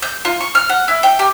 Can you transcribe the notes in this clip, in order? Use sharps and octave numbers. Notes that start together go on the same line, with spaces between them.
G6
F4
C#6
F6
F#5
E4
G5
G4